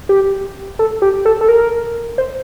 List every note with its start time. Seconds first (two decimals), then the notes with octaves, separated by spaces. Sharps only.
0.09 G4
0.79 A4
1.02 G4
1.25 A4
1.41 A4
1.49 A#4
2.18 C5